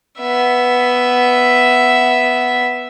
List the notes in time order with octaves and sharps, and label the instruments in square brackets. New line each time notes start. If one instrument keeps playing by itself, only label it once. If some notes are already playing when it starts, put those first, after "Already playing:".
[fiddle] B3 E5